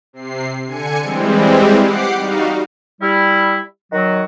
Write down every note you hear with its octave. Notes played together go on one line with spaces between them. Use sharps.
C3 C7
D3 G#5 C#7
E3 G3 G#3 C4
G4 F#5 D6 C7
G3 D#4 F#4 F5
G3 E4
D#3 F#3 F#4